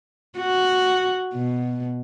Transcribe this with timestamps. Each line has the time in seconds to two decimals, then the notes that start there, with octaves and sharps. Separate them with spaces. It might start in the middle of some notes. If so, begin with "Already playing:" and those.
0.38 F#4
1.33 B2